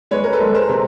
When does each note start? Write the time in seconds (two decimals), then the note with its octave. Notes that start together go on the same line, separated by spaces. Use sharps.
0.11 G#3 B4 C#5
0.24 A#4
0.33 A4 B4
0.40 G#3
0.55 A#4 C5
0.69 C3